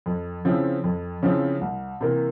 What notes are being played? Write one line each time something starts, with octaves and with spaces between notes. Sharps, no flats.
F2
C#3 F3 C4 E4
F2
C#3 F3 C4 E4
C2
C3 E3 A#3